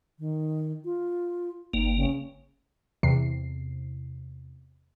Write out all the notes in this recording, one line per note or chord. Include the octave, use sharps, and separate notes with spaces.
D#3
F4
G1 A#3 D#4
C#3
E2 C3 C7